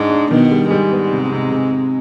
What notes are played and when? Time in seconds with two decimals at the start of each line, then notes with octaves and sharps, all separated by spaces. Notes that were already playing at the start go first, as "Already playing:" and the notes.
Already playing: G#2 G#3 D4
0.11 D4
0.31 B2 D#3 B3
0.51 G3
0.70 G#2 G3 G#3
0.91 B3
1.11 C3
1.32 C3
1.52 C3
1.72 C3